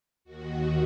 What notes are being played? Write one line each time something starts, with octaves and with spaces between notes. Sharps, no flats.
D#2 D#3 F#4